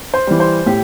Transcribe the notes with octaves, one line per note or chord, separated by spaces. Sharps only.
C5
E3 G3
C5
A2 G4